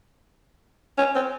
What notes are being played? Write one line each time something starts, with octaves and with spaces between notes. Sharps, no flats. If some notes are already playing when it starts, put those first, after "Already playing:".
C#4
C4